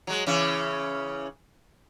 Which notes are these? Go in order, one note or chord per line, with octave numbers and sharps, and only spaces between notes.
F#3 G#3
C#3 E3 C#4